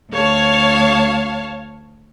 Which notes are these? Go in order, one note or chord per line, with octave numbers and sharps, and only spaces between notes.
D2 C#5 F5 A5